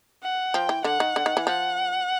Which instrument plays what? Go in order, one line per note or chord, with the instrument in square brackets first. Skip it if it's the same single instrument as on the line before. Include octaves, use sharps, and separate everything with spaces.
[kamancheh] F#5
[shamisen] F3 [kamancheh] G5
[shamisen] E3
[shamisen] D3 [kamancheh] F#5
[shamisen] D#3
D3
D#3
E3
[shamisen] F3 [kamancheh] F#5